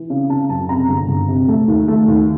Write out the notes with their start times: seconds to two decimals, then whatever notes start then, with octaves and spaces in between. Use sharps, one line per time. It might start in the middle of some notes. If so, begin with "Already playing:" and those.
Already playing: E3
0.10 C#3
0.29 C#3 A5
0.49 F#2 A5
0.69 C3 A#5
0.89 G1
1.09 G1
1.28 C3
1.48 A3
1.68 D#2
1.88 A3
2.08 D#2